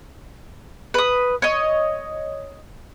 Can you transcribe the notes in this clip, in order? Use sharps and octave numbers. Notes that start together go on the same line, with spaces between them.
B4 D#6
C#5 D#5